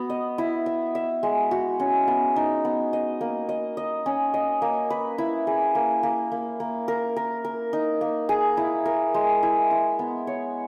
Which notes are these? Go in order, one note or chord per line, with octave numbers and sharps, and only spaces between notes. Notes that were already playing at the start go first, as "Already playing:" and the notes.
Already playing: B3 F#4
D#5
E4
E5
E5
G#3
F#4
C#4
B3
D#4
B3
D#5
A#3
D#5
D#5
C#4
D#5
A#3
B4
E4
G#4
A#3
A#3
A#3
A#3
A#4
A#4
A#4
D#4
A#3
G#4
E4
A#4
G#3
E4
E4
B3
C#5